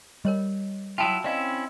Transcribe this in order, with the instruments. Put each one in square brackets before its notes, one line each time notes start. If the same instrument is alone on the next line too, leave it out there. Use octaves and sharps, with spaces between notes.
[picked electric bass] G3 [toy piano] A#4 C#5 D#5
[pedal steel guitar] F#3 E4 F4 [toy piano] G5 A5 D#6
[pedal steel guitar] C4 C#4 E4 [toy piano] D5 D#5 F5